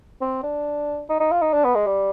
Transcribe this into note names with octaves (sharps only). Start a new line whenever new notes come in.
C4
D4
D#4
D#4
F4
D#4
D4
B3
G#3
G3